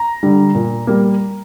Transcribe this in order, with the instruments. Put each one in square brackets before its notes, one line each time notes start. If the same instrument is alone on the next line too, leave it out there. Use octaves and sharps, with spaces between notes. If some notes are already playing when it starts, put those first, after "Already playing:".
Already playing: [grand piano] A#5
D3 G3
A#2
G3 A#3